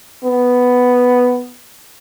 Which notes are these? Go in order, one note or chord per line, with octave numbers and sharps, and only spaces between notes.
B3